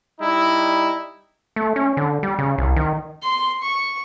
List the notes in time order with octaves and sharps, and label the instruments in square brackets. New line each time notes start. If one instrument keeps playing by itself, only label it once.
[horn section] G3 D#4 E4
[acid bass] A3
C#4
D3
G3
C#3
C2
D#3
[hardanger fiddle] C6
C#6